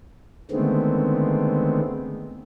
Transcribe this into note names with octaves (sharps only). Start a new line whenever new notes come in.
D3 D#3 G#3 A3 B3 C4